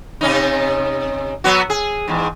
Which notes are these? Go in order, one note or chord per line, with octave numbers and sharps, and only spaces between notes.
C3 C#4 D#4
F#3 B3 F#4
G#4
E2 G#2